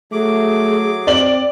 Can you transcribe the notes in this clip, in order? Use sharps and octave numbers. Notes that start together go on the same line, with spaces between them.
F#3 A3 G#4 D6
C4 D5 F#7